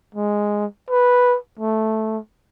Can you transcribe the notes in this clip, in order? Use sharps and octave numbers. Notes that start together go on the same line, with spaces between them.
G#3
B4
A3